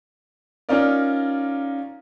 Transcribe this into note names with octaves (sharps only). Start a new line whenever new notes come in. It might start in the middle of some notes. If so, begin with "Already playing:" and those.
C#4 D#4 F4 A#4 D5